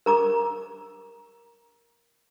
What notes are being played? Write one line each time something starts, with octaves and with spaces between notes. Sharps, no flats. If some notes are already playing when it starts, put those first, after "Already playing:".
A#4 A#5 D6